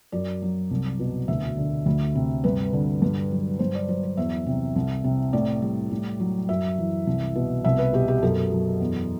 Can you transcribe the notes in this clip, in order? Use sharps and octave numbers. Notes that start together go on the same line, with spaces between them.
F#2 D5
F#3
C2
B2
D2 E5
D3
D2
C3
G2 B4
D3
G2
F#3
G2 C5
D5
F#3 C5
C5
E2 E5
C3
C2
C3
A2 D5
G3
A2
F#3
F#2 E5
E3
C2
B2
C2 E5
B4
B2 G4
G4
F#2 A4
F#3
E2